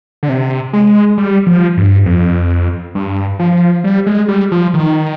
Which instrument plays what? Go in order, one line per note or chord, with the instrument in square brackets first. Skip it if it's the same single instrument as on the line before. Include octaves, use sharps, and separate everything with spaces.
[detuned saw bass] D3
C3
G#3
G3
F3
G2
F2
G2
F3
G3
G#3
G3
F3
D#3